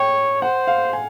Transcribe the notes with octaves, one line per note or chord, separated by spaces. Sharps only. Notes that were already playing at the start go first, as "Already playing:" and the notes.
Already playing: C#5 G5
C5 F#5
F5
G#5